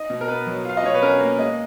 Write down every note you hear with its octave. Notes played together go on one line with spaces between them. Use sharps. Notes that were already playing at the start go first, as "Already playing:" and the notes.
Already playing: D#4 D#5
B2
A#4
B3 B4
F#3
F4 F5
D#5
B2 C#5
B4
C#4 A#4
A#3
G#3 D#5